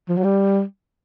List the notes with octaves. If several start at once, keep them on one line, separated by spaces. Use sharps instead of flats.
F3
F#3
G3